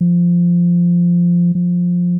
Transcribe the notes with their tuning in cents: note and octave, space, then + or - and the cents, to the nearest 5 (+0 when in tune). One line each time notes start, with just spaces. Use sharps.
F3 -5
F3 +15